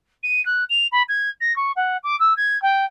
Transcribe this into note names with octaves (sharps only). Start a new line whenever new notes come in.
D#7
F#6
F7
B5
G#6
A#6
C#6
F#5
D6
E6
G#6
G5